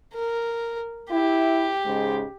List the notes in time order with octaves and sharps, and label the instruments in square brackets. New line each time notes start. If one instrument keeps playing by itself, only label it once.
[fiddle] A#4
[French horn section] E4 [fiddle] G4
[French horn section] G#2 C#3 G#3